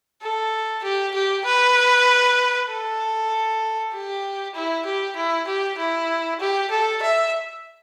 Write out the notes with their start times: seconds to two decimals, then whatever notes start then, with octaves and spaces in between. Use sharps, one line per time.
0.22 A4
0.83 G4
1.14 G4
1.45 B4
2.69 A4
3.92 G4
4.55 E4
4.86 G4
5.16 E4
5.47 G4
5.78 E4
6.40 G4
6.71 A4
7.02 E5